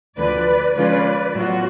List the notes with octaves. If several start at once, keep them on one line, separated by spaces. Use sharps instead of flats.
D2 D3 F3 B4 D5
D3 F3 G#3 C#4 F4 B4 D5
A2 F#3 B3 F4 F#4